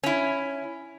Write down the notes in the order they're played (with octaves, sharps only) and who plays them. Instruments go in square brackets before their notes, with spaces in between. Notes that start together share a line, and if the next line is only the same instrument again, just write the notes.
[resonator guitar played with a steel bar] C#4 E4